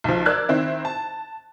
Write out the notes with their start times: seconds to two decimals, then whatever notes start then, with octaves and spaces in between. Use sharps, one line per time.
0.04 B1 F3
0.26 A#4 D5 E6 F#6 G#6
0.49 D#3 C4 E4
0.85 A5